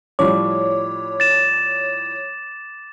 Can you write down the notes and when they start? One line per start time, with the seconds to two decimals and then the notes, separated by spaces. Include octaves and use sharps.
0.19 A2 F3 G3 C#5 D6
1.20 A6 E7